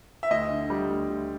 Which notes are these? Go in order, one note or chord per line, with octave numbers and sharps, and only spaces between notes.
E5
D2 D#5
D3
G3
D2
D2